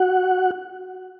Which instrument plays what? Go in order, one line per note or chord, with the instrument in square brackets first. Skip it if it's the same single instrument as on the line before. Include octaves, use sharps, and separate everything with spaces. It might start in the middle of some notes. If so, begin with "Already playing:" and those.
Already playing: [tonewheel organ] F#4 F#5